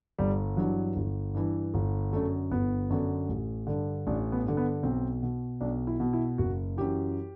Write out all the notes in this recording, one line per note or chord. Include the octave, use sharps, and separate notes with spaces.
G1 G3
G2 E3 F#3
G1
G2 E3
G1
F#2 D3 A3
G1 B3
F#2 D3
A1
G2 D3
A1 D4
B3
G2 D3
B3
B1 C4
B2
B1 D4
E4
B2
E4
F#1 F#4
F#2 E3 G4